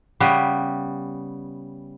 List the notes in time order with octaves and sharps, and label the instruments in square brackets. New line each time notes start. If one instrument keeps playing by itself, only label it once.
[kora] C#3 G3 B3